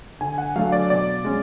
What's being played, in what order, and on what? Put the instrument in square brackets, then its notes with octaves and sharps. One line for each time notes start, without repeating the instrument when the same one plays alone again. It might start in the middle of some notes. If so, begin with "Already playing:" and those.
[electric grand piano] D3 G#5
F#5
F#3 A3 D4 F5
D5
B2 D5
G#3 C#4